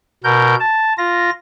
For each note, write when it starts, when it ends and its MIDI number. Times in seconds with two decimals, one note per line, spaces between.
0.24 0.55 47
0.24 0.55 70
0.24 0.55 91
0.60 0.93 81
0.98 1.30 65
0.98 1.30 94